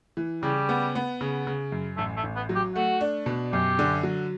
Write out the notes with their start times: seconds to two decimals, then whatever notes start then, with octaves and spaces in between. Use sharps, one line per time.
0.17 E3
0.43 C#3 G3
0.69 B3
0.95 B3
1.21 C#3
1.47 C#3
1.72 F#2
1.97 A1 A3
2.17 A3
2.23 A1
2.36 B3
2.49 F#3
2.56 G4
2.75 A3 F#4
3.01 D4
3.26 B2
3.53 F#2 G4
3.79 D3
4.03 F#3